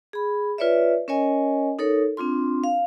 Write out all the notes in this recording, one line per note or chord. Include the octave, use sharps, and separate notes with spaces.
G#4 B5
F4 B4 C#5 D5 E5
C#4 A#4 C#5 D#5 G#5
D#4 A4 A#4 C#5
C4 D4 F4 C6
F5